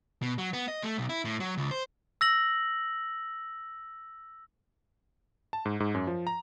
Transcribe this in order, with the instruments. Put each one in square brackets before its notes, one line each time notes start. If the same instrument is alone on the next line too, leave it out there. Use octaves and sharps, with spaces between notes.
[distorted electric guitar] B2
F#3
B3
D#5
A3
B1
E4
A2
F#3
C#2
C5
[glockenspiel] E6 A#6 F#7
[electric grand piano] A5
G#2
G#2
F#2
F3
A#5